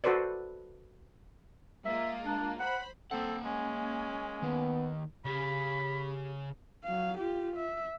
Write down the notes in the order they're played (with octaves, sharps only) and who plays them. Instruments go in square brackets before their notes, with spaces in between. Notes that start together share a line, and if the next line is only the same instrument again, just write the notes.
[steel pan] F#4 A4 B4 C5 D5
[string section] G#3 A#3 F4 [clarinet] E5
[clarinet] D4
[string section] C5 B5 [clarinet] F#5
[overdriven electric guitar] A#3 F#5 [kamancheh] C4 [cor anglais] A4
[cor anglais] G#3 [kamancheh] C#4
[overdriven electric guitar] D#3 A#3 [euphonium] B3
[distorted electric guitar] C#3 G#4 [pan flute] G4 [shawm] B5
[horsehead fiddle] F#3 F5
F4 G4
E5